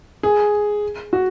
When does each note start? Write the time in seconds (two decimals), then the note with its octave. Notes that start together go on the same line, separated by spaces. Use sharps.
0.23 G#4
1.13 F#4